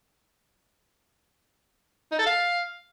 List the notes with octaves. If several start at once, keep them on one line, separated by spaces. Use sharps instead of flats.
D#4
A4
F5